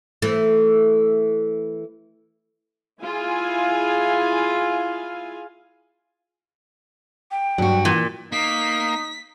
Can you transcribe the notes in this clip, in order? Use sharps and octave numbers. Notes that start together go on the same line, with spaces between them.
E3 A3
E4 F4 G#4 F5 G#5
G5
G2 F#3 F#4
A#2 E3
A#3 D#4 B6